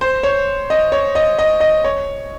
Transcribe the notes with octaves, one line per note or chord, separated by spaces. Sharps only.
C5
C#5
D#5
C#5
D#5
D#5
D#5
C#5